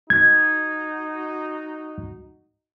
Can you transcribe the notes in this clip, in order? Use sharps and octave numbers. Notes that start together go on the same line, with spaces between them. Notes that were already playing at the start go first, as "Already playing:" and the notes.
D#4 F#4 G#6